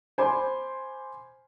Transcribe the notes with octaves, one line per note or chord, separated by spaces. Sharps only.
C5 G#5 B5 C6 D6